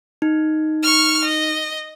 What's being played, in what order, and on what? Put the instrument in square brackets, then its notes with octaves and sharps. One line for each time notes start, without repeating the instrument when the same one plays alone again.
[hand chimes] D#4
[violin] C#6 F6
D#5